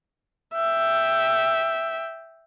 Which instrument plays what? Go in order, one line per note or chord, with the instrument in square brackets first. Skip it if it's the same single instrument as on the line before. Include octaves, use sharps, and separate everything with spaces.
[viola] E5 G5